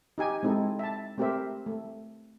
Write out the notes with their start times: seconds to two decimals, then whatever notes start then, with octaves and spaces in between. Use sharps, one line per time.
0.18 D#4 G4 G#5
0.43 G#3 C4 D#4 E4 A4
0.79 E5 A5
1.18 A3 C4 G4 A#4 C5 E5
1.66 A3